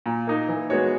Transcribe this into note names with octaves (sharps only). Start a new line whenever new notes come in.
A#2
A#3 D#4
E3
G#3 B3 F#4 C#5